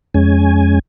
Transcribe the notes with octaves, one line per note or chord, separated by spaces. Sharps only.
F2 G#3 C#4 G#5